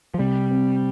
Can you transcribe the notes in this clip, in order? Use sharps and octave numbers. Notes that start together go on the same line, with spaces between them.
F3
C3 G3
C4